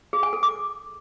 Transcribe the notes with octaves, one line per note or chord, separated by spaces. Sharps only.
G#4
G#5
A4
D6